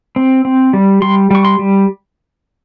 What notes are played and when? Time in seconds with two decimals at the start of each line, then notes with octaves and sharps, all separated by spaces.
0.16 C4
0.45 C4
0.73 G3
1.02 G3 C6
1.31 G3 C#6
1.45 C6
1.59 G3